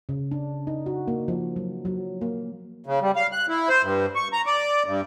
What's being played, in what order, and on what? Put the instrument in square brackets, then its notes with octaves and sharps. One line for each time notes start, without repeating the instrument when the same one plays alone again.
[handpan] C#3
D4
D#4
F#4
A#3
F3
F#3
F#3
A#3
[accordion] C#3
G3
F5
F#6
E4
C5
G2
C#6
A#5
D5
G2